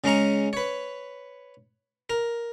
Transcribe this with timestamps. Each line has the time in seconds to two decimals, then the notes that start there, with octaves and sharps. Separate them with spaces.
0.04 C#3 G#3 C#4 A#5 C#6
0.53 B4 C#5
2.10 A#4